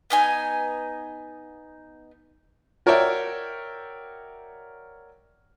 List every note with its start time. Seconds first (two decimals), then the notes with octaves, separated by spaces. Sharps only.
0.10 B3 D#4 G#5
2.86 F#4 A#4 C#5 D5 E5 G5